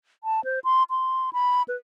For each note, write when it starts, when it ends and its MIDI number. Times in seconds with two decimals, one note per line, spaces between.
0.24 0.44 81
0.44 0.60 72
0.64 0.83 84
0.90 1.30 84
1.33 1.63 83
1.68 1.77 71